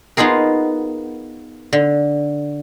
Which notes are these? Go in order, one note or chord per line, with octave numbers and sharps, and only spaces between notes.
B3 D#4 F4 G#4 A#4
D3